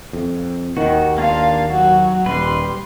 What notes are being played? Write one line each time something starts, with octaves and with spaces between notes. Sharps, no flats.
F2
D#2 D#3 F#4
A#3 D4 F4 F5
F#3 F#4
D#1 G3 B4 C6